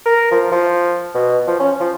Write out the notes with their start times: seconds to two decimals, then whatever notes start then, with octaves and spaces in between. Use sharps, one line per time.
0.06 A#4
0.31 F3
0.52 F3
1.15 B2
1.48 F3
1.60 C#4
1.80 F3